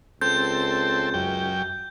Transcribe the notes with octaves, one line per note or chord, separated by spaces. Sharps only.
C#2 C4 A4 G6
F#2 G5